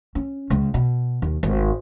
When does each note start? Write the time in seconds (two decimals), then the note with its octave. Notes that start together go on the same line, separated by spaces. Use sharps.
0.15 C#4
0.50 C#2
0.74 B2
1.22 D#2
1.43 G#1